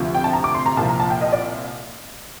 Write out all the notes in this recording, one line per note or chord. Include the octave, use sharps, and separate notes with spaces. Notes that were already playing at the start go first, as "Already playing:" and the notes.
Already playing: D2 C3 F3
G5
A5
A#5
D6
C6
A#5
C2 A#2 F3 A5
A#5
A5
G5
D#5
D5